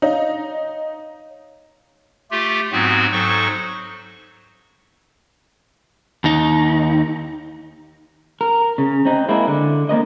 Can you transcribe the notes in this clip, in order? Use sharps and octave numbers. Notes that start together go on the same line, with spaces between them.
D#4 C#5 F5
A3 F4 G4
G#2 F#3 B3 C4 F#4
G#2 F#3 A4 C5 C#6
D#2 D#4
A#4
C#3
C4 D#4
G#3 A#3 E4
D3
A#3 B3 A#4 D#5